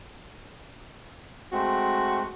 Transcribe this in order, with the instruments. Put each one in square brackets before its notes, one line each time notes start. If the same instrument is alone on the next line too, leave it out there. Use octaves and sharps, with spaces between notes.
[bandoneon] G#3 A3 C4 [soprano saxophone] F#4